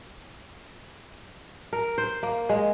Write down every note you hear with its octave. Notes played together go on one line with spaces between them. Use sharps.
A#4
C5
A#3
G#3